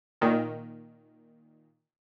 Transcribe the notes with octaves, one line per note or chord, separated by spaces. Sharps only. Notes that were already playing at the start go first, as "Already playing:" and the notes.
A#2 D#3